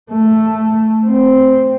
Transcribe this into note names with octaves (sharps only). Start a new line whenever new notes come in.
A3
C4